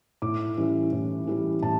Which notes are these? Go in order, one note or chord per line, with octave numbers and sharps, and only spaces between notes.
A2 D6
E3 G3 C#4
A2
E3 G3 C#4
A2 A5